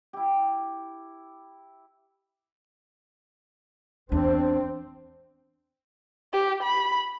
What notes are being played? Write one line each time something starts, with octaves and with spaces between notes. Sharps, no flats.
E4 G4
E2 C4 D4
G4
B5